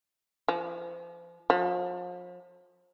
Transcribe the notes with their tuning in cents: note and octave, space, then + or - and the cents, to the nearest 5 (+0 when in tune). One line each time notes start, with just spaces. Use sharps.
F3 -35
F3 +40